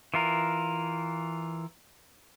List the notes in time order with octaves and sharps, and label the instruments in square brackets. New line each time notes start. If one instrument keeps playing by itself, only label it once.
[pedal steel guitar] E3 F4 A#4